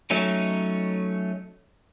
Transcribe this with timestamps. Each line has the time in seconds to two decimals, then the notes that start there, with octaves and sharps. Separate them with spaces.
0.10 F#3 A3 C#4 D#4